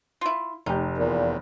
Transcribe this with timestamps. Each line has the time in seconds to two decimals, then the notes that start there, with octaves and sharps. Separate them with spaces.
0.21 E4 F4
0.66 F1 D#4 G4
0.98 E2 A#2